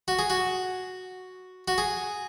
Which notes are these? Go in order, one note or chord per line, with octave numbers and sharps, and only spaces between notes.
F#4
G#4
F#4
F#4
G#4